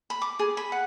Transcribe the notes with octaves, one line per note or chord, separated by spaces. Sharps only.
B5
D6
G#4
B5
F#5